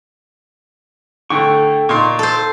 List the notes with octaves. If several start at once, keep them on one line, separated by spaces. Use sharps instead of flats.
A2 D3 A4 G5 C#6
A#2 D#4 C6 C#6
A4 C5